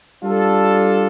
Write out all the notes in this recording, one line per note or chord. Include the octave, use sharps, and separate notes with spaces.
G3 D4 F4 A4